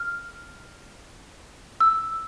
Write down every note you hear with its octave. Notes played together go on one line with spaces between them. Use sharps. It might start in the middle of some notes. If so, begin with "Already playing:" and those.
Already playing: F6
E6